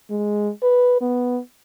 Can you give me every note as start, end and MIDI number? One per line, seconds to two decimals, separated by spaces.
0.10 0.50 56
0.63 0.98 71
1.01 1.39 59